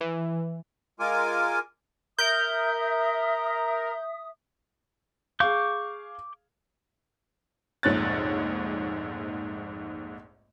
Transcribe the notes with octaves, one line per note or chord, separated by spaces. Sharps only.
E3
G#3 F4 A#4 G#5 D6
A#4 E5 D#6 G6
G#4 F5 C#6 D6 G6
F1 A#1 G#2 C#5 F#6 A6